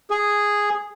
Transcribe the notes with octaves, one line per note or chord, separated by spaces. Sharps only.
G#4